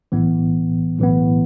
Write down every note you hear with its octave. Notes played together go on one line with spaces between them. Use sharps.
B1 A2 E3 B3
B1 A2 E3 B3